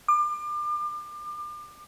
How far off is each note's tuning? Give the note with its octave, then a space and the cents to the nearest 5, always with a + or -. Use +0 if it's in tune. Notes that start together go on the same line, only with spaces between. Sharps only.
D6 +35